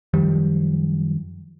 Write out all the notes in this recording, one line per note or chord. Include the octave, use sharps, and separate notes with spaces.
F#2 D#3 F3 G3